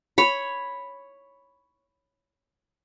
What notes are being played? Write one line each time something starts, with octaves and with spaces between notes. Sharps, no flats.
C#5 B5